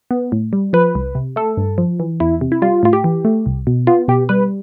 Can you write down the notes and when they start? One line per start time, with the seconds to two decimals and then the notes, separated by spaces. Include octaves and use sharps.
0.11 B3
0.32 A2
0.53 G3
0.73 F3 B4
0.95 C2
1.15 C3
1.36 A3 A4
1.57 G2
1.78 F3
2.00 E3
2.20 E2 E4
2.41 C3
2.52 E4
2.62 G3 F4
2.83 A2 F4
2.93 G4
3.04 E3
3.25 A3
3.46 C2
3.67 B2
3.87 B3 F4
4.08 B2 G4
4.29 G3 B4